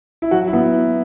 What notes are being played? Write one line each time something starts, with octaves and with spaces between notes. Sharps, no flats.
E4
F#3 F#4
E4
B3